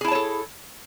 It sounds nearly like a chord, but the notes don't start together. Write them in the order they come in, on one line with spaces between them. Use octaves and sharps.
G#4 E4 A5 C#5 A4